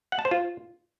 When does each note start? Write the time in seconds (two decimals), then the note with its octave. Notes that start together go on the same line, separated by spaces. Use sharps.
0.12 F#5
0.19 A5
0.25 C5
0.31 F4